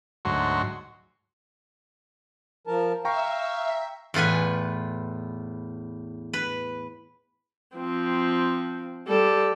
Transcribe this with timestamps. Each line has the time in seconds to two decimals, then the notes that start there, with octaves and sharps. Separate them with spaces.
0.25 D2 G#2 F#3 F#4 C6
2.67 F3 A#4 A5
3.05 E5 F5 G5 A#5 C#6
4.14 E2 A2 F4 B4 G#5
6.33 B4
7.76 F3 C4
9.08 G3 A4